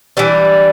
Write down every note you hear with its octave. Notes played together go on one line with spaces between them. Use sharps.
E3 G3 D4